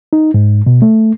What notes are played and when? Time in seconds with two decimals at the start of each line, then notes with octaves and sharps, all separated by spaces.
0.13 D#4
0.34 G#2
0.67 B2
0.82 A3